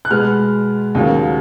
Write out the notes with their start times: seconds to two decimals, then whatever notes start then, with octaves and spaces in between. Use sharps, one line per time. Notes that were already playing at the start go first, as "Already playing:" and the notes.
0.05 F#6
0.11 B2 G#3 B3 F6
0.95 D#2 C#3 F#3 A#3